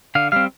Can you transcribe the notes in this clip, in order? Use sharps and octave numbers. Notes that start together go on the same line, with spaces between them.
D3 F5
G3 C4 F5